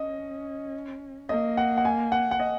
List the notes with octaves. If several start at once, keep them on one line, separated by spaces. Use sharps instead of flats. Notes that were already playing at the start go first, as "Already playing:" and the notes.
Already playing: C#4 D#5
A#3 D#5
F#5
F#5
G#5
F#5
F#5
D#5